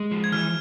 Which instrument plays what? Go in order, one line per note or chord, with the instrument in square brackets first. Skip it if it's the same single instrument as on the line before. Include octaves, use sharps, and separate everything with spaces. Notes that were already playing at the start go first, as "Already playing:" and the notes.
Already playing: [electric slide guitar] G#3
F3
[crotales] G#6
[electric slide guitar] E3 [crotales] F6